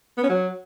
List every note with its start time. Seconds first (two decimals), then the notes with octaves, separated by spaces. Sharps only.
0.18 B3
0.23 C#4
0.29 F#3